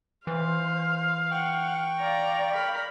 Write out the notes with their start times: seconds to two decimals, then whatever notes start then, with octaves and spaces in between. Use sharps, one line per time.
0.27 E3 C5 F5
1.31 F#5 G5 C#6
2.00 D5 F5 A#5
2.53 A#4 B5